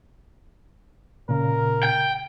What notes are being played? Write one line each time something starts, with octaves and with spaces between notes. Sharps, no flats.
A#2 C#3 A#4
G5